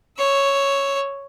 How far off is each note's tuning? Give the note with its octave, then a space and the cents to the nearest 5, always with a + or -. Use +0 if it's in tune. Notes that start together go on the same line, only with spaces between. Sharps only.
C#5 +0 E6 +0